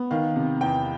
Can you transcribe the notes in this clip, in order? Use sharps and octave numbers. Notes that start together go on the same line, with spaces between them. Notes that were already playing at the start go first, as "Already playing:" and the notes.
Already playing: B3
D#3 F5
C3
E2 G5